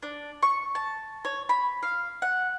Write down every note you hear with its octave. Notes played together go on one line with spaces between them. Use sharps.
D4
C#6
A5
C#5
B5
F5
F#5